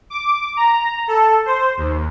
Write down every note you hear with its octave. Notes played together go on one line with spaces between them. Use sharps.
D6
A#5
A4
C5
D#2